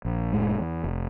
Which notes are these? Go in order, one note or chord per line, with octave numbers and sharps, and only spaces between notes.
A#1
F1 A2 G#3
E2
F1